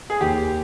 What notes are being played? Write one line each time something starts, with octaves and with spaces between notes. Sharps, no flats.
G#4
D#2 G4